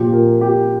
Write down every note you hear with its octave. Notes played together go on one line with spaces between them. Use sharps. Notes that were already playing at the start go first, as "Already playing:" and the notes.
Already playing: A#2 F3 G4
A#4
G4